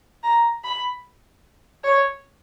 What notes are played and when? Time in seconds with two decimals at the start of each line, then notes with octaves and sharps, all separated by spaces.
0.24 A#5
0.64 B5
1.84 C#5